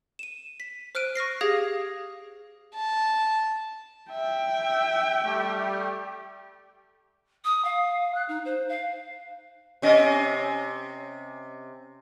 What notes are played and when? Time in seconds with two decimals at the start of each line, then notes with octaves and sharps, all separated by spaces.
0.19 D#7 E7
0.60 B6
0.95 C5 F6 F#6 D7 D#7
1.15 C#6 F6 A#6 C7
1.41 G4 G#4 F5 D#6 G#6 A#6
2.75 A5
4.12 E5 G5
5.24 G3 A3 G4
7.45 D#6
7.65 F5
8.15 F#6
8.29 D#4
8.45 C5
8.69 F5
9.82 C3 C#4 D#5